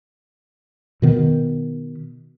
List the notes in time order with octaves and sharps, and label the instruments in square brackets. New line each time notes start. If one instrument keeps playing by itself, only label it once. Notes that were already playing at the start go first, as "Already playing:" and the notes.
[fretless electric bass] B2 D#3 B3